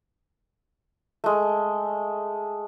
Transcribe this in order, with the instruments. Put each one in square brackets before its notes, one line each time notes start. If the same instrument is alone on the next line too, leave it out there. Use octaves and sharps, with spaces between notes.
[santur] G#3 A3